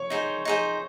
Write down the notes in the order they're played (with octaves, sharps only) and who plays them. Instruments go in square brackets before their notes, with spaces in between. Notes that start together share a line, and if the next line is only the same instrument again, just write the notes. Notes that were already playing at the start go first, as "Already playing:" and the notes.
Already playing: [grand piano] C#5
[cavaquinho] D#4 G#4 C5
D#4 G#4 C5